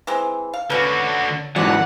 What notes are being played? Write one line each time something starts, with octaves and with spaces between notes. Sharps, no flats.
E3 G#3 C4
F5
D3 C#4 F#4 B4
G#2 E3 F#3 D5 F#5